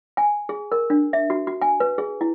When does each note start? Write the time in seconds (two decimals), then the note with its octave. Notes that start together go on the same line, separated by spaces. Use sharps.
0.17 G#5
0.49 G#4
0.72 A#4
0.90 D4
1.13 E5
1.30 F#4
1.47 F#4
1.61 G#5
1.80 B4
1.98 G#4
2.21 E4